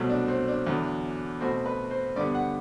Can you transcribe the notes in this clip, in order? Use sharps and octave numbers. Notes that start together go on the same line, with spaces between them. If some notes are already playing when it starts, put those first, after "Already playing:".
Already playing: C2 B2 F#3 A3
D4
C4
D4
E2 D3 F#3
B2 A3 C4 F#4
B4
C5
G2 D3 G3 B3 D5
F#5